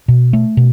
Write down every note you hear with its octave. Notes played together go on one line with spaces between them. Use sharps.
B2
A3
B2